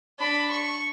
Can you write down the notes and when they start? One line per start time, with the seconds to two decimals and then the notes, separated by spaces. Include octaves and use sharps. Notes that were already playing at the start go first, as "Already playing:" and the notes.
0.19 D4 B5
0.50 C#6